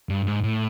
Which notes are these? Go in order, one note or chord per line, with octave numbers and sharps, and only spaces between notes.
G2
G#2
A2